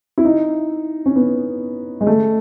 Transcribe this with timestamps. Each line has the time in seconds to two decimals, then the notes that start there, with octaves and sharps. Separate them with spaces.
0.18 E4
0.25 D#4
1.06 C#4
1.16 B3
2.01 G#3
2.07 A3